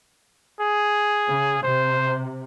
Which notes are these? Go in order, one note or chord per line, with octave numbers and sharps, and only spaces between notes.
G#4
C#3
C3 C5